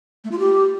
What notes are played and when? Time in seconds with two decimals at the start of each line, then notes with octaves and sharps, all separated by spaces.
0.24 A3
0.32 F4
0.39 G4